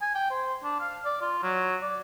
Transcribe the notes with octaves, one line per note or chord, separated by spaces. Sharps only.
G#5
G5
C5
D4
F5
D5
F4
F#3
D5